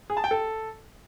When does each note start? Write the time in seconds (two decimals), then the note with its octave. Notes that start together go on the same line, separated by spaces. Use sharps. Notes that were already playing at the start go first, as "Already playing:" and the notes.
0.10 G#4
0.17 A5
0.24 G5
0.31 A4